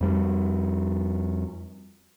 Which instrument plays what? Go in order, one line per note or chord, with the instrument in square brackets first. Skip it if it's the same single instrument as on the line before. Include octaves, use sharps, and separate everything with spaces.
[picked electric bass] F2 G3